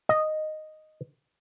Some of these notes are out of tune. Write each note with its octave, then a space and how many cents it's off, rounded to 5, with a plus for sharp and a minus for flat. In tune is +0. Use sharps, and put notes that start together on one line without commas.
D#5 -5